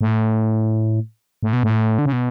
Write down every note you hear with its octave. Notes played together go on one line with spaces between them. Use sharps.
A2
A2
B2
A2
D3
C#3
B2